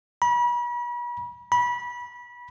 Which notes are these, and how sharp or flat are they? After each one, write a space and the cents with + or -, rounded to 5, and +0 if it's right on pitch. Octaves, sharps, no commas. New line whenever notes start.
B5 -40
B5 -25